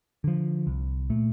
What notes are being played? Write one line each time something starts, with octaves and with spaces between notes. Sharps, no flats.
D3 F3
C2
A#2 A3